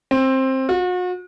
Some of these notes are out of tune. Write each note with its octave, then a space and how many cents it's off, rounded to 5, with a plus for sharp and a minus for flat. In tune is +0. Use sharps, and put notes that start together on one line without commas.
C4 +15
F#4 -40